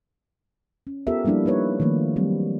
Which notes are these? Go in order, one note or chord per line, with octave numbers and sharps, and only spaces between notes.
C#4
B3 F4 G4 A4 A#4 E5
F3 G3 A#3 D4 E4
A#3 D#4 B4 C#5
D#3 F3 A3 A#3
F#3 G3 C4